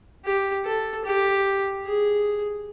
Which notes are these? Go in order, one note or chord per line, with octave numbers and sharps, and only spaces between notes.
G4
A4
G4
G#4